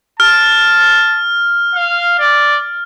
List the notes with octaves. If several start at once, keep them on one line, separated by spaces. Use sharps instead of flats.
A5 F6
F5
D5